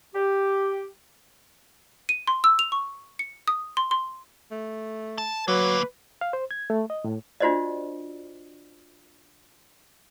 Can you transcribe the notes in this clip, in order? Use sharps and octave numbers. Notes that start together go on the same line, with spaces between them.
G4
D#7
C6
E6
F7
C#6
C#7
D#6
C6
C6
A3
A5
D2 F#3 A#3 B4
F5
C5
G#6
A3
D#5
A2
D4 F4 F#4 C5 D5 D#5